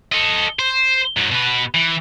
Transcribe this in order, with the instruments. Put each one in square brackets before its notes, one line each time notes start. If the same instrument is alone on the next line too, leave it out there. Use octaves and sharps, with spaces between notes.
[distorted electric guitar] A4 D#5
C5
G#2 F#3
B2 B4
E3